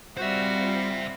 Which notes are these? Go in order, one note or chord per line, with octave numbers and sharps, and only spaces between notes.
G3 C4 F4 F#4 C5 E5